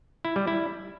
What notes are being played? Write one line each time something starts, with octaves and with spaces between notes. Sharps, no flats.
E4
G3
E4